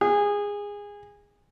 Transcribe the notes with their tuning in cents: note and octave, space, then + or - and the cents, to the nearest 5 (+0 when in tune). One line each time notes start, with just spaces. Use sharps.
G#4 -20